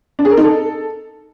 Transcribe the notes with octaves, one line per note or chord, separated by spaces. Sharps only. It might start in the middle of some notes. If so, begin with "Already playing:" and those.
D4
G#4
A#4
D#4
A4